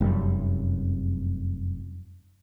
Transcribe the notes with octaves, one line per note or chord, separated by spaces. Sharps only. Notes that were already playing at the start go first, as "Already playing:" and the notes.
F1 F#2 G3